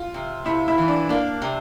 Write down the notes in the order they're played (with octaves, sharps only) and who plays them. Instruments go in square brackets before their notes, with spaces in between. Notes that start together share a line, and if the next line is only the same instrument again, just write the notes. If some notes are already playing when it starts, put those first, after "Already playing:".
Already playing: [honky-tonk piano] F4
[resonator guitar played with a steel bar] C3
[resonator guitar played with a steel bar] C3 [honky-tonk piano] E4
[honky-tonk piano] E4
[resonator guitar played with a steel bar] E3
[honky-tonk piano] D4
[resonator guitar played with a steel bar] A#3 [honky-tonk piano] D4
[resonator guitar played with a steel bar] C3